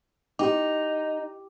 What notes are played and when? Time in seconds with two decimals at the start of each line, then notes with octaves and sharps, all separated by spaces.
0.39 D#4 G4 G5 D6